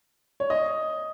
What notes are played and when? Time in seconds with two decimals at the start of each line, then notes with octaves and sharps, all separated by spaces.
0.40 C#5
0.50 D#5